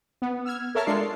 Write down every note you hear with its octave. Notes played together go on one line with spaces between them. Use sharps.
B3
E6 F6 G#6
A4 A#4 C#5 E5 A5 F6
G#3 D4 F4 D5 C#6 C7